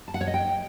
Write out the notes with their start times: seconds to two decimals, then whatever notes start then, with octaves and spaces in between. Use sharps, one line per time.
0.08 A5
0.14 F#5
0.21 C#5
0.27 D#5
0.34 G5